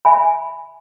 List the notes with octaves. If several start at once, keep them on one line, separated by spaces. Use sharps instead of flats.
E5 G#5 B5